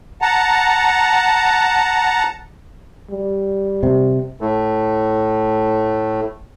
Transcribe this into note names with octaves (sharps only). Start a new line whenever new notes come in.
F#5 A5 A#5
G3
C3
A2 A3